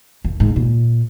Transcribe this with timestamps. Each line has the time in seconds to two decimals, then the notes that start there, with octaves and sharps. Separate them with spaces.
0.25 F#2
0.40 G#2
0.56 A#2